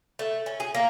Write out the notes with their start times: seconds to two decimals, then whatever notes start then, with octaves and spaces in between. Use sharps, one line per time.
0.19 A3
0.46 C#4
0.60 G#4
0.74 A#3